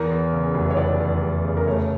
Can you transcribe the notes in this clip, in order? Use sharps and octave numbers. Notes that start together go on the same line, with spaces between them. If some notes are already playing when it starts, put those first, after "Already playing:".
Already playing: E2 A#4
E2
C#3
F1
C#5
E2 D5
E2
F1
C#3
A#4
A3 C#5